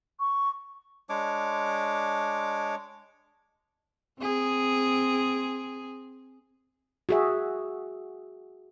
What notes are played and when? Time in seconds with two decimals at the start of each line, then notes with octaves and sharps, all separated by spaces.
0.20 C#6
1.09 G#3 D4 C#5 D6
4.20 C4 G#4
7.09 F#4 G#4 E5